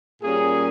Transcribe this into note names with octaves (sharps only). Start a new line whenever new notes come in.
A#2 G3 A#3 C#4 G#4